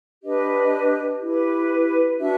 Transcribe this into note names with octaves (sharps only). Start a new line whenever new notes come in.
D4 G4 B4 D#5
E4 G4 B4
D4 F#4 B4 E5